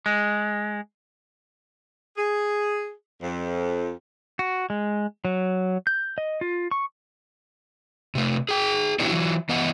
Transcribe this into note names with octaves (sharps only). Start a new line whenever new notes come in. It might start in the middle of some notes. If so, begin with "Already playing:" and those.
G#3
G#4
F2
F#4
G#3
F#3
G6
D#5
F4
C#6
C3 A3
G#4 G5
B3 C#4 D4 E4 F#4 G4
E3 F#3
E3 B3 D5 D#5 F#5